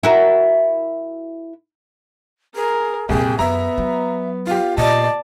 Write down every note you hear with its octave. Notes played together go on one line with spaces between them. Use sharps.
E4 F#4 A#4
G#4 A#4
C2 F2 A#2 G#4 G5
F#2 B3 E5 A#5
F#3
F4 G4 F5
A#2 D5 D#5 A5